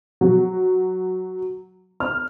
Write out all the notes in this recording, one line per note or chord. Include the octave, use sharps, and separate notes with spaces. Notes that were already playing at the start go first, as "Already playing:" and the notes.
F#3
F6